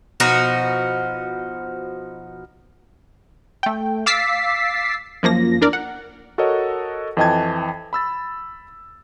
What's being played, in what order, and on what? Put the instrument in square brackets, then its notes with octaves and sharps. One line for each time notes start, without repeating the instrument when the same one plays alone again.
[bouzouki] B2 F3 D#4 F#4
[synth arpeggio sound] A3 G5
F5 D6 E6 A6 B6 C7
F#2 F3 A#3 A#6
E2 D4 A#4 D5
F#5
[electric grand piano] F#4 A4 A#4 C#5 D#5 F#5
F2 E3 D#5 G5 A5 G#6
B5 E6 A6